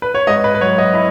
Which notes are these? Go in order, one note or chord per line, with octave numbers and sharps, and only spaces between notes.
B4
C#5
G#2 D#5
B4
B4
F#3 C#5
D#5
E4 B5